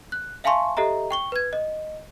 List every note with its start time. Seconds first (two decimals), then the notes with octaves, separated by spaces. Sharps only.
0.12 F#6
0.44 E5 F5 G#5 A5 C6 C#6
0.77 G4 A4 D#5 E5 A#5
1.11 G5 C#6 G7
1.32 B4 G#6
1.53 D#5